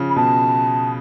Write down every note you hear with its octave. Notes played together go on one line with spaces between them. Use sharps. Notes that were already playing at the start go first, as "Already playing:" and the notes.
Already playing: C#3 F3
B5
B2 A5